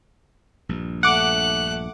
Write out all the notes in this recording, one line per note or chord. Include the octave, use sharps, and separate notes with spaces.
A#1 G2
A3 F#5 D6 F#6